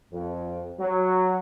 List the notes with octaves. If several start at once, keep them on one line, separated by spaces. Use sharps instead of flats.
F2
F#3